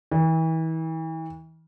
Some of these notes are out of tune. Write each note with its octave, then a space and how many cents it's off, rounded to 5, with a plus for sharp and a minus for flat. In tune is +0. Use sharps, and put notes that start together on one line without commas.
E3 -35